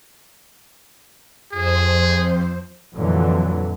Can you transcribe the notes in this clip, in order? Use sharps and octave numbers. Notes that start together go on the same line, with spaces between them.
F2 G#4 C5
F2 A#2 D3 E3 F#3